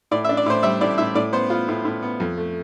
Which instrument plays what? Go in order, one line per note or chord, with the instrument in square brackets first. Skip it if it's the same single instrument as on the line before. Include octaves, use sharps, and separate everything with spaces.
[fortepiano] A2 D5
E5
D4
D5
A2 C5
G3 E5
A2 D5
A2 E5
A2 D5
B3 C5
B3 F4
A2
A2
B3
F2
A3